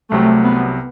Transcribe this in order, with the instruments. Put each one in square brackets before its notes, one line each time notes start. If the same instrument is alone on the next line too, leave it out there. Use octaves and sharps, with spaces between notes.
[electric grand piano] C2 C3 F#3 C4 [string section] A3
[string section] B3